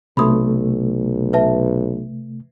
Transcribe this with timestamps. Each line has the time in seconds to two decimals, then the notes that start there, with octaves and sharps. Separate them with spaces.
0.17 B1 C3 A3 B5 C6 D#6
1.33 B4 E5 A5